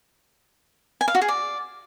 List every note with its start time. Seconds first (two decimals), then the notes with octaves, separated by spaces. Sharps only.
1.01 G#5
1.08 F5
1.15 F#4
1.22 G#4
1.28 D5